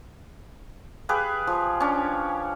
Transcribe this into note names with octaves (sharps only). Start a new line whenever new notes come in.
G4 G#4 B4 F5
F3
C#4 D4